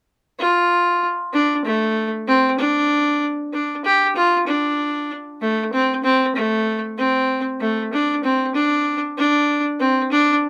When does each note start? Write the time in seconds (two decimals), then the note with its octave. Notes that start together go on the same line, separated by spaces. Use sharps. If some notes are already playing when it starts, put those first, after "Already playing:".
0.39 F4
1.34 D4
1.65 A3
2.28 C4
2.59 D4
3.53 D4
3.85 G4
4.16 F4
4.47 D4
5.41 A3
5.72 C4
6.04 C4
6.35 A3
6.98 C4
7.60 A3
7.92 D4
8.24 C4
8.55 D4
9.18 D4
9.80 C4
10.12 D4